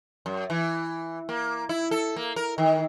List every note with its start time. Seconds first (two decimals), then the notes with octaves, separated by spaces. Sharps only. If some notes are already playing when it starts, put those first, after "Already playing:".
0.26 F#2
0.50 E3
1.29 A#3
1.69 E4
1.91 A4
2.16 A#3
2.36 A#4
2.58 D#3